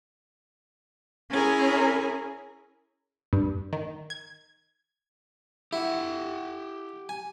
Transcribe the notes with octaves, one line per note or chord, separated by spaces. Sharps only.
C#4 E4 G#4 A#4
G2
D#3
G#6
E4 G4 F#5 G5
G#5